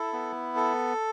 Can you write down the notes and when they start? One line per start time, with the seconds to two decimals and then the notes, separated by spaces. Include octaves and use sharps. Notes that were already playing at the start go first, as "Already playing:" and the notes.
Already playing: E4 A4
0.13 B3
0.56 A4